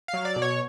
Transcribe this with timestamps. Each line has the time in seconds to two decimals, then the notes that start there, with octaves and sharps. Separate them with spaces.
0.08 F5
0.14 F#3
0.25 D5
0.36 B2
0.42 C#5